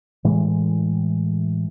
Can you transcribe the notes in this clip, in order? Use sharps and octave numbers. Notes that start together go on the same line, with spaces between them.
A2 E3 G#3